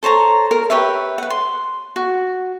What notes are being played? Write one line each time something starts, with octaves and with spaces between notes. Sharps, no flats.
A4 C5 C#5 A#5
A#4
G4 B4 C#5 E5
B4 F#5
C6
F#4